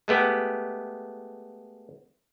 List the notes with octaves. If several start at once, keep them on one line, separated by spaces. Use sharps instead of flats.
G#3 A3 B3 G4